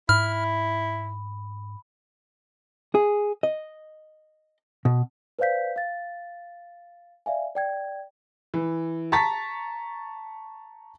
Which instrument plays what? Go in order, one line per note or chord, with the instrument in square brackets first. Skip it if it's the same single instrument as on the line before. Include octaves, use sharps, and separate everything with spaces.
[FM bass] G#2 [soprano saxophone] E4 [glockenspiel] B5 [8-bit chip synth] F6
[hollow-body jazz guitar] G#4
D#5
B2
[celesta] B4 C5 D5 F5 G6 B6
F5 A6
D5 E5 F5 G#5
D5 G5 G#6
[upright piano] E3
A5 A#5 C#6 A6 B6